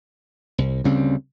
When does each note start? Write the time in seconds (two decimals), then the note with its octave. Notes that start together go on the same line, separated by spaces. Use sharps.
0.58 C2
0.84 D2 C#3 G3 C4